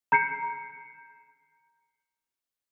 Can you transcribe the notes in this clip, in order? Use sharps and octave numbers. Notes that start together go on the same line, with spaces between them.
A#5 G6 C7 C#7